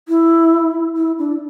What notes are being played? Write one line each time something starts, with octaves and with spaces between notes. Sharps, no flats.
E4
E4
D4